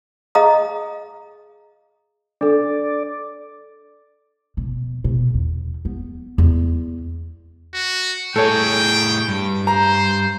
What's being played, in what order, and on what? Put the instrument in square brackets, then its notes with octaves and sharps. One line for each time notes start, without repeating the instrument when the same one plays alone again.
[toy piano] G#4 D#5 F5 A#5 D#6
[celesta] D4 A4 [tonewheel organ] D5
[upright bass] B2
B2
E2
B3
E2
[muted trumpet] F#4
[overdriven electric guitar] A2 G#4 [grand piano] A4 C#5 [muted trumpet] G5
[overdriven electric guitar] G2
[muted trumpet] C5 [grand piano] A#5